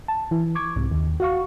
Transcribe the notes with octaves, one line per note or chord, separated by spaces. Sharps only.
A5
E3
C#6 D6 G#6
C2 G#2 C3
D#2
F#4 F5 C#6